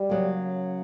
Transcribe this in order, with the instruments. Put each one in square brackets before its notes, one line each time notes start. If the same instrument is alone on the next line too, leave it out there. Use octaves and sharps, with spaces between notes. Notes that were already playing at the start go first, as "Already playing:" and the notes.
Already playing: [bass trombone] G3
[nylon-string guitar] C#3 F#3 A#3